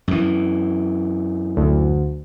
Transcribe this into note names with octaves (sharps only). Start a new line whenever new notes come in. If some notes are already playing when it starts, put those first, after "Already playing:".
F#2 E3
D2